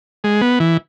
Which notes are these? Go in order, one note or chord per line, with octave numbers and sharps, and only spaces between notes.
G#3
B3
E3